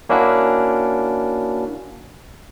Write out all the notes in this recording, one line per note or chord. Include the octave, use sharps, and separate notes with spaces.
A#3 C#4 D4 E4 F#4